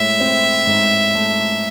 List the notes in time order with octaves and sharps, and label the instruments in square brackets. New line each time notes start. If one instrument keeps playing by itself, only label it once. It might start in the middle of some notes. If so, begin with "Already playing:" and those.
Already playing: [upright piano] A2 G#3 [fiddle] E5
[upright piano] C4
G#2
A3